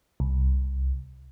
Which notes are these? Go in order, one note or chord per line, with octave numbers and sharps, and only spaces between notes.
C2